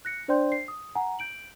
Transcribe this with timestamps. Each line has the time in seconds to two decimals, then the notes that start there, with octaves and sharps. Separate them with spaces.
0.05 F#6 A#6 C#7
0.28 D4 C5 D5 G5 C6 G6
0.52 C7
0.68 D#6
0.95 F#5 G#5 A#5
1.19 G6 D7 F#7